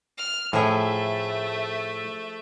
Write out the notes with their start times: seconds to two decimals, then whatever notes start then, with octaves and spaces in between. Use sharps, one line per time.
0.17 F6
0.53 A2 F3 A3 G#4 E5